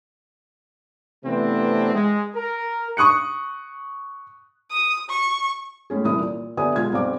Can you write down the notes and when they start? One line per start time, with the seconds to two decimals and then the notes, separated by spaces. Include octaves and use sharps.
1.25 C3 E3 A3 B3 C4 D4
1.94 G#3
2.34 A#4
2.97 C#6 D#6 F#6 C#7
4.71 D#6
5.10 C#6
5.90 A2 G#3 C#4 G#4
6.04 D#1 C2 E3 E4 D#6
6.19 A#2
6.57 D3 B3 G4 E5 G#5 D#6
6.76 B1 B2 G#3 F4 G#6
6.92 B1 G2 C4 F5 D6